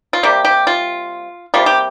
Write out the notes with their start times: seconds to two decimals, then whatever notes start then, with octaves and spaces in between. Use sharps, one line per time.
0.13 F4
0.23 C3 G3 A#3 G4
0.44 G4
0.67 F4
1.54 C3 G3 A#3 F4
1.66 G4